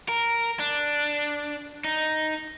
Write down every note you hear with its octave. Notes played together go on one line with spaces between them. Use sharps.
A#4
D4
D#4